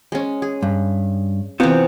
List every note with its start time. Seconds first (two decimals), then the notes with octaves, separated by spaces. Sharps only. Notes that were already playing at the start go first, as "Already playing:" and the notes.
0.12 G#3 C#4
0.42 G#4
0.63 G2
1.60 C3 E3 B3 C4 F4